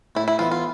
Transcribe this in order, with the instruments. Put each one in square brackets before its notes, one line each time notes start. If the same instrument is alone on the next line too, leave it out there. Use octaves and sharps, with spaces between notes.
[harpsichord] A2 [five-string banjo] E4
[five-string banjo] E4
[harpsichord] E3 B3 [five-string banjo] F4
[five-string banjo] F4